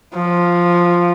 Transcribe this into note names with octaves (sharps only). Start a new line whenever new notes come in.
F3